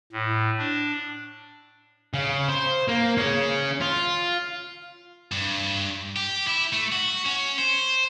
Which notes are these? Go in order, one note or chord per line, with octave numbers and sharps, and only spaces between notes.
A2
D4
C#3
C5
A#3
C#4 G#4
F4
G2
G4
E4
A3
F#4
C#4
C5